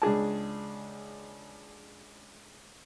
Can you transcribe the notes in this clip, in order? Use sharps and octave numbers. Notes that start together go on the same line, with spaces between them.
C#2 D4 G#4 A5